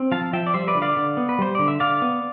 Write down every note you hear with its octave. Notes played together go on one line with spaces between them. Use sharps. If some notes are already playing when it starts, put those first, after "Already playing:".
Already playing: C4
F3 F5 A5
F3 E5 G5
D5
G3 C5 E5
B4 D5
D3
D5 F5
D3
B3
B4
G3 C5
D3 D5
E5
D3 D5 F5
B3